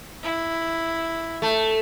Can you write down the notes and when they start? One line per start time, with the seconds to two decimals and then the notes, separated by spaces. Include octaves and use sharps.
0.23 E4
1.42 A3